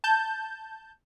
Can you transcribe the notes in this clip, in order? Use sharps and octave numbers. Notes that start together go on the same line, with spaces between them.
A5 G6